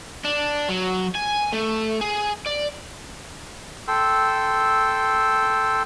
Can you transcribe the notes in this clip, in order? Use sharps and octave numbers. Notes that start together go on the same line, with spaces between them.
D4
F#3
G#5
A3
G#4
D5
A4 G5 C6 E6